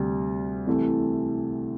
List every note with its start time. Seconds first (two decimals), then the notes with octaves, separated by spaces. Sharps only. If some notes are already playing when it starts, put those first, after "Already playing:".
Already playing: D2 C3 G3
0.66 C2 C3 E3 A3